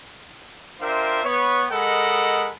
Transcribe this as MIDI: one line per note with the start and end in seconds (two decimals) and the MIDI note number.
0.81 1.23 62
0.81 1.23 65
0.81 1.23 70
0.81 1.23 72
0.81 1.23 76
0.81 1.23 79
1.24 1.66 59
1.24 1.66 71
1.24 1.66 73
1.71 2.51 56
1.71 2.51 69
1.71 2.51 70
1.71 2.51 75
1.71 2.51 78
1.71 2.51 83